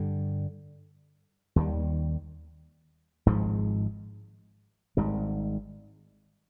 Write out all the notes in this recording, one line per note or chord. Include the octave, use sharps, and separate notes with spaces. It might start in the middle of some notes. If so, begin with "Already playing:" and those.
Already playing: G2 D3 G3
D#2 D#3 G3
G#1 G#2 F3 G#3
G#1 G#2 G3